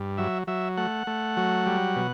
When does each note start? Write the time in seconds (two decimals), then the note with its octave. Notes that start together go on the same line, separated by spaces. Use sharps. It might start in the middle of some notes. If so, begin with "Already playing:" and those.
Already playing: G2
0.18 F#3 E5
0.47 F#3 E5
0.77 A3 F#5
1.07 A3
1.37 F#3
1.66 G3
1.96 B2